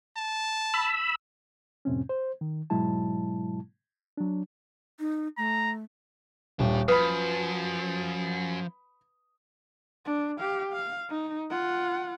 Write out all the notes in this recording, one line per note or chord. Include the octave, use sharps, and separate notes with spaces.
A5
B5 E6
F2 A2 C3 C4 C#4
C5
D#3
G#2 B2 F#3 G#3 E4 A5
F#3 D4
D#4
A3 A#5
D#1 D4 G4
F#2 F3 B4 B5 D#6
D4
G4 F5
F5
D#4
F4 F#5